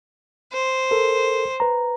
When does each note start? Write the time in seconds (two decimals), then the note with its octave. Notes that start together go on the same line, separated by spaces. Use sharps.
0.53 C5
0.91 A4 A#4
1.60 B4 A#5